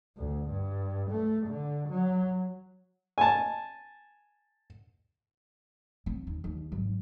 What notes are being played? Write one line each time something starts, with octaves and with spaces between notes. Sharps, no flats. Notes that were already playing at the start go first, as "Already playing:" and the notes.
D2
G2
A3
D3
F#3
G#5 A5
C4
D#2
D#2
G#1 F#3